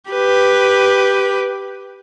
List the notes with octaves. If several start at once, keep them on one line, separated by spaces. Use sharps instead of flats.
G4 B4